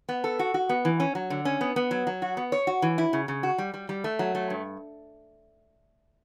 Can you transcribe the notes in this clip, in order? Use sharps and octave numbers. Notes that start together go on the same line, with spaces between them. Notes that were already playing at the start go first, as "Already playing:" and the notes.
B3
A4
F#4
F#4
B3
E3
C#4
F#3
D3
C#4
B3
B3
F#3
F#3
F#4
B3
C#5
F#4
E3
E4
C#3
C#3
F#4
G3
G3
G3
A3
F#3
A3
G2